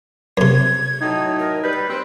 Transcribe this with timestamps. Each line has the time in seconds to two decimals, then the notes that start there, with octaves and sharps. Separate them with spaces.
0.37 F#2 C3 G#6
1.01 A2 F#3 D#4
1.39 A#4
1.63 G3 B4 G6
1.89 C4 C5